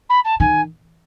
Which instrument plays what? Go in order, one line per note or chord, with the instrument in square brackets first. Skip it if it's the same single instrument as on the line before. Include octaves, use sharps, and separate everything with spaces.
[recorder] B5
A5
[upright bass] D#3 [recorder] G#5